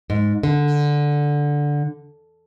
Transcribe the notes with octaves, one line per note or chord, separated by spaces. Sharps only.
G#2
D3